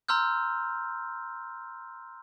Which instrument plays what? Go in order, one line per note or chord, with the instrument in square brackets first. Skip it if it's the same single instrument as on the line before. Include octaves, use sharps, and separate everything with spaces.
[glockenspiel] A#5 C6 E6 F6 G6